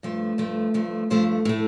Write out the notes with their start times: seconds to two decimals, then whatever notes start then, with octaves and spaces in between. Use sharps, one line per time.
0.03 G2 F3 A3
0.38 G2 F3 A3
0.74 G2 F3 A3
1.10 G2 F3 A3 C5
1.45 A2 A3